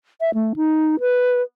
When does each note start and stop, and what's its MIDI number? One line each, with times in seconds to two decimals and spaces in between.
0.21 0.30 76
0.34 0.53 57
0.56 1.00 63
1.00 1.41 71